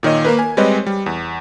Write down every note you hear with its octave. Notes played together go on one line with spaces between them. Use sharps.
A#2 D#3 C#5 D#5
A#3 A#4 B4
G#5
G3 G#3 C4 B4 C#5 D#5
G3
E2